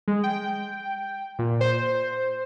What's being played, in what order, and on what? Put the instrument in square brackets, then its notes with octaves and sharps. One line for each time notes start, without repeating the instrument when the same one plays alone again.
[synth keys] G#3
G5
A#2
C5